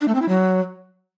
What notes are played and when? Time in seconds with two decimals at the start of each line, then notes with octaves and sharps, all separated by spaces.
0.01 D4
0.08 A3
0.15 C4
0.22 E4
0.28 F#3